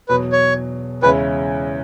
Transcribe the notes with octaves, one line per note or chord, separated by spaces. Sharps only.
E2 B2 F#3 B4
C#5
E2 C#3 G#3 C#4 E4 B4